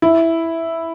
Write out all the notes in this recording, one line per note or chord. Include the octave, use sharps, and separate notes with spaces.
E4